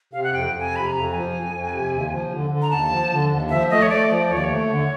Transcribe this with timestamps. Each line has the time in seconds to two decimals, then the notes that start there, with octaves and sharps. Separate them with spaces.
0.13 C3 F5
0.24 F#5
0.33 F2 G5
0.52 F2
0.60 G#5
0.73 C3 B5
0.87 A#5
0.93 F2
1.12 F3 G#5
1.33 F2
1.52 F2
1.71 C3
1.92 D#2
2.11 F3
2.32 D3
2.50 D3
2.62 A#5
2.71 D#2 A5
2.90 F3
3.11 D3
3.31 D#2
3.50 F3 E5
3.70 A3 D#5
3.82 C#5
3.90 A3 D5
4.09 F3 D5
4.30 D#2 C#5
4.37 D5
4.44 C#5
4.49 A3
4.69 D3